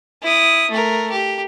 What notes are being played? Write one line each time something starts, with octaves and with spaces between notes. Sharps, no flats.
E4 D#6
A3 A#4
G4